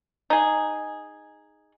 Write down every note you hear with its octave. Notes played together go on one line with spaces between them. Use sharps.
D#4 G#4